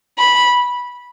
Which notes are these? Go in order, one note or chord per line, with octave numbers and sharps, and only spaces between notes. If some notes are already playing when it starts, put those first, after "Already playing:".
B5